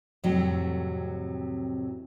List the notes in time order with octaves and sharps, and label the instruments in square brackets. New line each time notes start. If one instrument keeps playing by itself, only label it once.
[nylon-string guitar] F2 A2 C3 E3 F#3